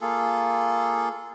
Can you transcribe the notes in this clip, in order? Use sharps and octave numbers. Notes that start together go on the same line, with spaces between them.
A#3 F4 G#4 A4